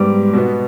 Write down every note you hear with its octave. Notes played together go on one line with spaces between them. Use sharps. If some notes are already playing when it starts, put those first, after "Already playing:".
Already playing: G#2 G3 B3 D6
B2 B3